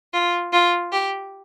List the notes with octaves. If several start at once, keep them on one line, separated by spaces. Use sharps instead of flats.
F4
F4
G4